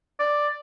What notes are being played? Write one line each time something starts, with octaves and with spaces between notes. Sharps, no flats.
D5